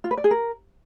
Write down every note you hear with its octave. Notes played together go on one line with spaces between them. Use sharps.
F4
B4
D5
G#4
A#4